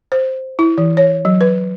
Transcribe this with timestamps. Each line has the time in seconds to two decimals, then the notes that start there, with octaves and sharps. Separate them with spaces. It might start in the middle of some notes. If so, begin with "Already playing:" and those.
0.12 C5
0.59 E4
0.78 E3
0.97 C#5
1.25 F#3
1.41 B4